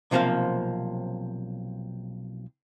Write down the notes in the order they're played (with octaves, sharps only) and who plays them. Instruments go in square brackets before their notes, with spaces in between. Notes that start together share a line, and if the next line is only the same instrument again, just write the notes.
[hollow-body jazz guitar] B1 C3 F3 A#3 C5 F5